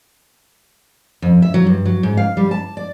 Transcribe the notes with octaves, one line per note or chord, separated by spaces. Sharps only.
F2
E5
F#3
G2
F#3
G#2
F5
G3
A5
D5